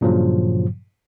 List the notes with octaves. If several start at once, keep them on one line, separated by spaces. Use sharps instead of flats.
G2 A#2 C#3 F3 F#3